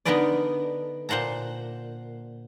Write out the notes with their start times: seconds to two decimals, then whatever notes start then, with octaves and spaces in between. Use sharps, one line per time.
0.05 D3 B3 D#4 A#4 B4 D5
1.09 A#2 C5 F#5 A5 A#5